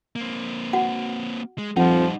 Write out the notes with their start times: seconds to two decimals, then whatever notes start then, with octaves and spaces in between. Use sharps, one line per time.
0.16 A#3 C4
0.73 F#4 F#5
1.58 G#3
1.77 F2 F3 G3 D#4 F#5